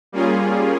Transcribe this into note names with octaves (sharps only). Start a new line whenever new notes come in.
G3 A#3 C#4 F4 G#4